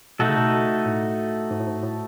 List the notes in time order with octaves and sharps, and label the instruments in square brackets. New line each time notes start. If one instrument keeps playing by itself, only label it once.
[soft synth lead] B2 [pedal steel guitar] A3 D#4 F#4 A4
[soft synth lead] C#3
B2
A2
G#2
A2
G#2
A2